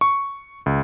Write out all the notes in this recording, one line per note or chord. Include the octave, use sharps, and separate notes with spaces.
C#6
C#2